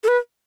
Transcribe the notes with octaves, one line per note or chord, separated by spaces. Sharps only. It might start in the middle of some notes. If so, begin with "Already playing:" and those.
A4
B4